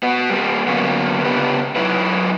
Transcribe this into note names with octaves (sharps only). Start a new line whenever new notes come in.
B3 F#4
G3 A#3
D3 F#3 A#3 B3 C#4
C#3 B3 G4 B4
F#3 D#4 E4 B4